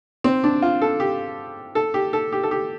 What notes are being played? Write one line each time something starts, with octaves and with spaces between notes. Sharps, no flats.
C4
D4
F4
A4
G4
A4
G4
A4
G4
A4
G4